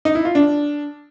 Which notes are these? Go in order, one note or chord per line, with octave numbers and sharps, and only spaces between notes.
D#4
E4
F4
D4